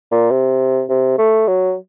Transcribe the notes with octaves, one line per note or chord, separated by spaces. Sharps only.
A#2
C3
C3
A3
F#3